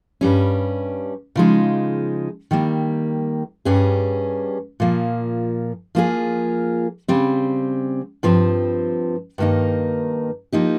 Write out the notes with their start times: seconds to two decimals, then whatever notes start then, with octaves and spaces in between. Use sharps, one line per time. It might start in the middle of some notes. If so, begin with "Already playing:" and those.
0.21 G2 G3 C#4
1.35 C#3 F3 G#3 D#4
2.51 D#3 G3 A#3
3.65 G2 G3 C#4 G#4
4.80 A#2 F3 A#3
5.95 F3 A#3 F4 G#4
7.08 C#3 G3 C4
8.23 G2 F3 C4
9.38 G2 D#3 A#3 D#4
10.52 F3 A#3 D#4 G4